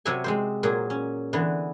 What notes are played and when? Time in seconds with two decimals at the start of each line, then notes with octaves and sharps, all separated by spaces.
0.05 C3 F#3 F#4 C#5 E5 G#5
0.24 G#3 C4 C5
0.63 A#2 F#3 G#4
0.90 C#4
1.33 D3 E3 B3